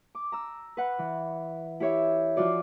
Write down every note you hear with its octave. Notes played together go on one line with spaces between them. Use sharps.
D6
A#5 E6
B4 F#5
E3
E4 G4 C#5 E5
F3 F4 F#4 D5